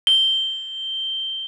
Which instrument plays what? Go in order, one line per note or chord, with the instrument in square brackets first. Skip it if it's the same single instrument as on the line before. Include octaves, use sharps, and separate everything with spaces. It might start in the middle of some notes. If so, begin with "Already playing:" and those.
[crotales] G7